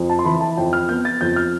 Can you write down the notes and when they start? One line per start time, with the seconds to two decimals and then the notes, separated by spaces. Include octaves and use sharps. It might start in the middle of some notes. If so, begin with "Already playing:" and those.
Already playing: F2
0.10 A5
0.19 C6
0.25 E3 B5
0.41 A5
0.57 F2 G5
0.73 F6
0.89 B3 G6
1.05 A6
1.21 F2 G6
1.36 F6